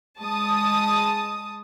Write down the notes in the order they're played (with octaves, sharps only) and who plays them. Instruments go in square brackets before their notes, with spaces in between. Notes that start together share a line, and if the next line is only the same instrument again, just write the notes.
[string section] G#3 A5 D#6